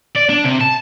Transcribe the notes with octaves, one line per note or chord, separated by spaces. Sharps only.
D5
D4
C3
A5